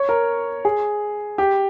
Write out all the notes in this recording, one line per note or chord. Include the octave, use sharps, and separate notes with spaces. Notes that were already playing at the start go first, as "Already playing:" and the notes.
Already playing: C#5
A#4
G#4
G4